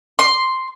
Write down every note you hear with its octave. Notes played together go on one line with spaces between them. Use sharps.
C6